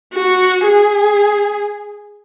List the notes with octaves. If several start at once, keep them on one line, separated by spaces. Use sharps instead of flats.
F#4
G#4